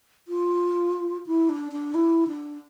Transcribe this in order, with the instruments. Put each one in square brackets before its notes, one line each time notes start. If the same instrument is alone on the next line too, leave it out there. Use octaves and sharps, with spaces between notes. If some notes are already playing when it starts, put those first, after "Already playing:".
[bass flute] F4
E4
D4
D4
E4
D4